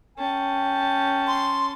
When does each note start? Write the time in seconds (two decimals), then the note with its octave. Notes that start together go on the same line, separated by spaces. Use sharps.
0.18 C#4 G5 A5
1.27 C6